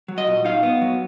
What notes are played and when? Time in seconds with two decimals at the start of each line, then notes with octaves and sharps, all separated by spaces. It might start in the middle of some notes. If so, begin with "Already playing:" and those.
0.08 F#3
0.18 D#5
0.27 A#2
0.45 D#4 F5
0.63 B3
0.82 F#3